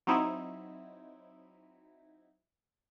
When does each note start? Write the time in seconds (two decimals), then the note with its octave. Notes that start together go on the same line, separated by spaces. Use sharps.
0.07 F#3 C4 D#4 E4